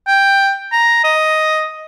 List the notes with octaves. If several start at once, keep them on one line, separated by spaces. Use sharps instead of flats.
G5
A#5
D#5